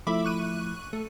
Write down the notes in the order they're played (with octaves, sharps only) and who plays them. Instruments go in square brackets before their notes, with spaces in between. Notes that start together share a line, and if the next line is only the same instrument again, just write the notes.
[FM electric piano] F3 A3 E4 [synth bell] E5 B5 D6
[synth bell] C#6 F#6 D#7
[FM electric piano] A3 [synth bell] A4